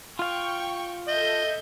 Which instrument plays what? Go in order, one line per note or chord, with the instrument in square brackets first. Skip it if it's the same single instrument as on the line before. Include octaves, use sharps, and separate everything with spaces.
[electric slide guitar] F4 F5 [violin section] G5 C#6
[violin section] A4 E5 G6 [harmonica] D#5